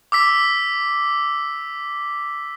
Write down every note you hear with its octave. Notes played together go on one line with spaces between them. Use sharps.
D6 E6 B6